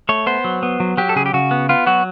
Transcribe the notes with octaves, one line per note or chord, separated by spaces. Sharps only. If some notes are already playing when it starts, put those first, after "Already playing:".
A3 C#5
B3 C5
F#3
B3
F#3
F#3 G4
A4
C#3 G#4
G4
C#3 F#4
B3
B3 F4
F#3 F#4